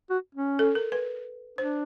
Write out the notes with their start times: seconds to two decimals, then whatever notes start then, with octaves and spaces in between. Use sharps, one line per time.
0.11 F#4
0.35 C#4
0.59 A4
0.75 A#4
0.92 B4
1.58 D4 C5